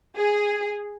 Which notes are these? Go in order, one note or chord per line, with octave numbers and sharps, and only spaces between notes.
G#4